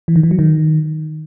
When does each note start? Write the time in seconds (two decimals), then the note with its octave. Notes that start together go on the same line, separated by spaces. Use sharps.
0.08 E3
0.16 D#3
0.23 E3
0.31 F#3
0.39 D#3